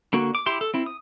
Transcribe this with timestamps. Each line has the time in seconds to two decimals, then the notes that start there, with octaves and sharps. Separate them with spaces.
0.13 D3 A#3 F#4
0.35 D6
0.46 E4 G4 C6
0.61 A4
0.74 C4 E4
0.86 D#6